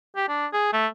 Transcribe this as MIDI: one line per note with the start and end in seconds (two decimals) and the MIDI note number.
0.16 0.27 67
0.29 0.47 62
0.53 0.72 68
0.73 0.87 57